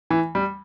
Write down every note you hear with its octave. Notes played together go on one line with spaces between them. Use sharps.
E3
G3